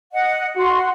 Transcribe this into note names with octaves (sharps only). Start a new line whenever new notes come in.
D#5 F#5
F#4 F#5 C6